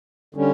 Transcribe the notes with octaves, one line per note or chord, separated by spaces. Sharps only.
D3 G3 C#4